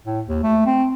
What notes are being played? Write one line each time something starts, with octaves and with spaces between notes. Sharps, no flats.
A2
D#2
A3
C4